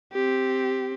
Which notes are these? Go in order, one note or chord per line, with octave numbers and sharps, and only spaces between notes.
C4 G4